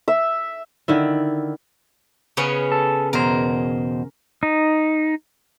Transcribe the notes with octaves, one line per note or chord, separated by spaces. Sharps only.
E5
D3 D#3 E4
C#3 B3 C#4
A4
E2 B2 A#4 C5
D#4